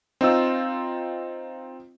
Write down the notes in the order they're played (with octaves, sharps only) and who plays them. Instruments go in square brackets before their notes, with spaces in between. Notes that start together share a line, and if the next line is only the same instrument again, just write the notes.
[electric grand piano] C4 D#4 F4 E6